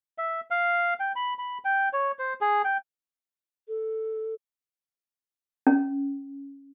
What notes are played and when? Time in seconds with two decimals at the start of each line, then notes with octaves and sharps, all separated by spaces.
0.18 E5
0.51 F5
1.00 G5
1.16 B5
1.39 B5
1.65 G5
1.93 C#5
2.19 C5
2.41 G#4
2.64 G5
3.68 A4
5.67 C#4